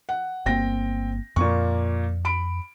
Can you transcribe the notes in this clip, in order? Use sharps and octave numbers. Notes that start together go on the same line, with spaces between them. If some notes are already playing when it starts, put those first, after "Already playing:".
F#5
G1 A#3 C4 G5 A#6
F2 A#2 A#3 C#6
B5 D7